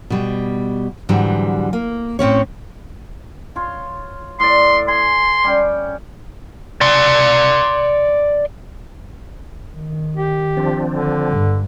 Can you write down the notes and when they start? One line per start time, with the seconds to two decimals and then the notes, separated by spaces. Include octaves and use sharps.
0.10 B2 G3
1.09 G#2 D3 E3 F#3 G3
1.73 A#3
2.19 A2 C4 C#4 C#5
3.56 F4 C#5 C6
4.40 A2 D5 C6
4.88 G#5 C6
5.44 G3 C#4 G5
6.81 D5 C6
9.73 D#3
10.16 G4
10.57 F3 C4 D4
10.90 D3
11.30 G2